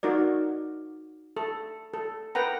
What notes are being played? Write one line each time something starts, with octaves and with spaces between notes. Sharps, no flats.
D#4 F#4 A#4 D5
A4
A4
A#4 B4 F#5 G5 A#5